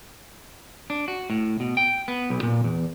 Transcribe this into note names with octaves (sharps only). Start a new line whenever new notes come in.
D4
F#4
A2
B2
G5
B3
B1
A#2
E2